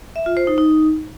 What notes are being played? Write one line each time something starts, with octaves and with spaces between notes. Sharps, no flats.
E5
F4
C5
D#4
D#4